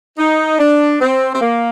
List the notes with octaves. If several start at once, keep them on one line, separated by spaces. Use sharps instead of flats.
D#4
D4
C4
C4
A#3